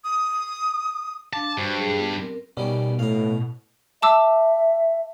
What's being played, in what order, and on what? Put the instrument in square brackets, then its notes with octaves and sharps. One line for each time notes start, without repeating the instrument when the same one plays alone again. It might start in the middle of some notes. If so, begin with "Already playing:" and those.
[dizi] D#6
[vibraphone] D4 F5 D6 [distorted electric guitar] A5
[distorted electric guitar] G2 [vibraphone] F#4 C5 C#6
[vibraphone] F#3 G#4
B3 F4
C4 A#4
[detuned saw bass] B2 [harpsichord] D#3 G3 C#4
[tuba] A2 [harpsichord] F5 A#5
[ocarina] E5 [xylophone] A5 D6 E6